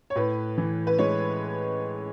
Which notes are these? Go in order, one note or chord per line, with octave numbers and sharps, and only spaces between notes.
C#5
A2 B4
E3
B4
G#3 C#5